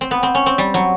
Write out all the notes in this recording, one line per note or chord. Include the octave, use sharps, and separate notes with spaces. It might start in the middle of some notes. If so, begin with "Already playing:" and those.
C4
B3
C4
C#4
C4
G3
F#3